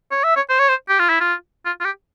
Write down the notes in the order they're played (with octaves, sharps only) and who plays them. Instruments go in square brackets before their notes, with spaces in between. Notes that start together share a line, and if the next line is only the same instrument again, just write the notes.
[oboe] C#5
E5
C#5
C5
C#5
C5
G4
F4
E4
F4
F4
F4
G4